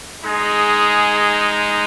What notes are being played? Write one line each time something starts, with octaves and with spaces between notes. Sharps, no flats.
G#3 D#4 G#4